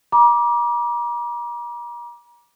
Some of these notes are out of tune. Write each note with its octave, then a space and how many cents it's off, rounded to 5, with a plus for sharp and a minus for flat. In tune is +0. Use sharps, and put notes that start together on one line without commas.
A#5 +40 D6 +0